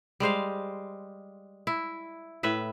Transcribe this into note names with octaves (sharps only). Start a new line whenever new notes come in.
G3 G#3 C5 F5
E4
A2 B4 E5